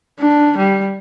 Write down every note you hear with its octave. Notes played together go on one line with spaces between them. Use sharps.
D4
G3